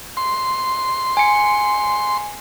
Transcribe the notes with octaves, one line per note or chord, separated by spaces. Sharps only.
C6
G#5 C#7